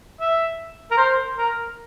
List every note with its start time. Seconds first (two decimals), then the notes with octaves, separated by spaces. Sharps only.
0.20 E5
0.91 A#4
0.97 C5
1.37 A#4